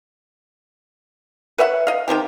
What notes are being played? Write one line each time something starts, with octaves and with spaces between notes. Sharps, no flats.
B4 C#5 E5 F#5
D#5 F5
D#3 F#3 C4 G4